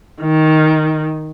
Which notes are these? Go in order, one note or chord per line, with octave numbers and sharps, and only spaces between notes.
D#3